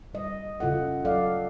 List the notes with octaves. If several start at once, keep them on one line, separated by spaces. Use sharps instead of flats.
G3 D#5
C#3 F4 A4 F#5
F#3 A4 D5 F5